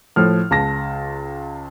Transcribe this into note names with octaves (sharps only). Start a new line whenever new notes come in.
A2 F3 F6
C#2 A5 A#6